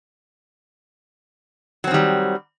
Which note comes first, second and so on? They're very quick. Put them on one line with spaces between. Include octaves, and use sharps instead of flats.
F#3 C4 D#3 G3